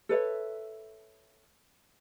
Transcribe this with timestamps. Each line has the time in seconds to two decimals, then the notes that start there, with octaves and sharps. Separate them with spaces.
0.09 A4 B4 C#5 E5